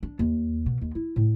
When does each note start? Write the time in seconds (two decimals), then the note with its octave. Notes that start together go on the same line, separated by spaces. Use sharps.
0.03 D4
0.19 D#2
0.66 B2
0.81 D#2
0.95 E4
1.16 A2